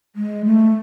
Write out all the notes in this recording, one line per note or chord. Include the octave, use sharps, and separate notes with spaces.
G#3
A3